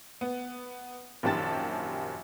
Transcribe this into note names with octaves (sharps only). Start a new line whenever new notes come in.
B3
A#1 F#2 D#3 G4 A5 A6